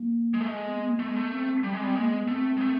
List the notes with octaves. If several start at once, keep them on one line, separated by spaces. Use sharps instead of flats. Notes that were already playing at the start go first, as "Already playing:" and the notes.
Already playing: A#3
G#3
A3
G#3
B3
B3
A#3
A3 B3
G#3
A3
C4
G3
G#3
G3 C4
G#3 A#3
B3
A3 C4
G#3
A3